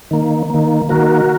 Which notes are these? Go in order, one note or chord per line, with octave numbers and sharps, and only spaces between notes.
D#3 A#3
D#3 A#3
D#3 A#3 F#4 A#4